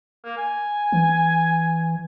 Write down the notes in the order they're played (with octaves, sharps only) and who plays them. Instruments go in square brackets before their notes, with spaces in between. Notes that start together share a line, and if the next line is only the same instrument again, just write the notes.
[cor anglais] A#3
G#5
[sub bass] E3